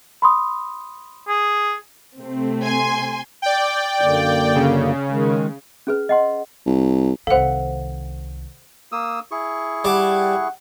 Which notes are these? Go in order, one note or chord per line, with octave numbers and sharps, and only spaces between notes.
B5 C6 D#6
G#4
C3 A3 C4
G#5 C6
D5 G5
F#2 D3 A#3
C#3
D#3 G#3
C#4 G#4 B4
D#5 F#5 C6
C2
C2 D#3 A4 C5 F5 F#5
A#3 D#6 E6
E4 G#4 C#6
G3 F#5 A5 D6